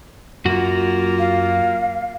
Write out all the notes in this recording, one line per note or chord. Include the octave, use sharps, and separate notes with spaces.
F#2 A#3 F4 F#4
F5